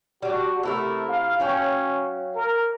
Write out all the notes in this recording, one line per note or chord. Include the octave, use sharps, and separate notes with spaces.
G3 D4 F#4
C3 A3 E4 A#4
F5
F#3 C#4 F5 G5
A#4